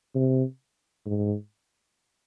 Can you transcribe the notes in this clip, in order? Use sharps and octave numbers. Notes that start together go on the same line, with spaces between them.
C3
G#2